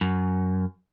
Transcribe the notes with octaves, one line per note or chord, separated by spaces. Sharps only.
F#2